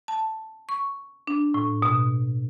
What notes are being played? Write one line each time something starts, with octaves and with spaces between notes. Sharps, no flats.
A5
C#6
D4
A2
B2